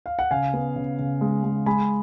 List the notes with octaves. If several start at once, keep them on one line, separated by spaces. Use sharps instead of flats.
F5
F#5
C#3 F5 G#5
B3
C#3
C#3
G#3
G#3
G#3 G#5 B5